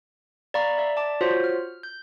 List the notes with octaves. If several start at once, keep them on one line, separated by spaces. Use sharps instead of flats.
D5 D#5 F5 A#5 B5 C#6
D5 E5
D5 A5 D6
F4 F#4 C5 C#5
F6
G6